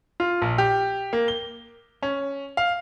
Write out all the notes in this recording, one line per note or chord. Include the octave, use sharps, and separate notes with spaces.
F4
A#1
G4
A#3
G7
C#4
F5